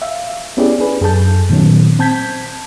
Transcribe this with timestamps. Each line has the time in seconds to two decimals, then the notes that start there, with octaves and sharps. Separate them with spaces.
0.02 E5 F5
0.57 B3 C#4 E4 G4 G#4 D5
0.79 D4 G#4 B4
1.01 F#2 G#4 A4 A5 G6
1.50 A#2 D#3 F#3 B3 C#4
1.99 C4 A5 G6 G#6 B6